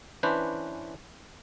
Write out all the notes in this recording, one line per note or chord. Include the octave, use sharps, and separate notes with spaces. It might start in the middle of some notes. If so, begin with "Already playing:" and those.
E3 C#4 D4 B4 C5